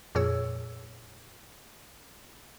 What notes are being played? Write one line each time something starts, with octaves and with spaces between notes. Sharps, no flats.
F2 A#2 G#4 C#5 E6